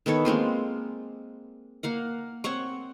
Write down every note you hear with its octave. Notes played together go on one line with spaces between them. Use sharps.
D#3 B3 A4 C#5
G#3 A#3 C4 F4
A#3 F5 F#5
C4 C#5 F#5 C#6